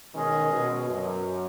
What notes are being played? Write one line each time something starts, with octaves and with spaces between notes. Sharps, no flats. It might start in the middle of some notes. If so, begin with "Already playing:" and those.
B2 D#3 G#3 C#4 G#4 D#5
B2
F#2